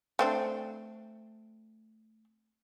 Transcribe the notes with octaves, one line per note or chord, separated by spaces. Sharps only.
A3 C4 D4